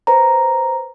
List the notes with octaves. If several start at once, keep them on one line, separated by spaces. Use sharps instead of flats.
B4 C5 A#5